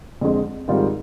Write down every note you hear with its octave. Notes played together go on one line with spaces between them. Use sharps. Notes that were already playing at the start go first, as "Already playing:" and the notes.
F2 D3 G#3 C4
G#2 D#3 G3 C4 F4